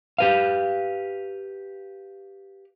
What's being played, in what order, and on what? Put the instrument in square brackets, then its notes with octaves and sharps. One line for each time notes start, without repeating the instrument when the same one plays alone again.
[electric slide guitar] G4 B4 F5